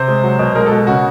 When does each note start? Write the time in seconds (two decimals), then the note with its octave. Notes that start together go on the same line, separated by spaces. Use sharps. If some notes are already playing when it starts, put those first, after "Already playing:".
Already playing: C3 C5
0.08 G#3
0.23 F#3
0.39 B2
0.55 G#3 A#4
0.66 A4
0.72 B2
0.87 C#3 F#4